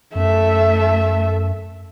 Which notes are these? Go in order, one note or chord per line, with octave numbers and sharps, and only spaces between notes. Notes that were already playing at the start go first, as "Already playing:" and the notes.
F#2 A3 E5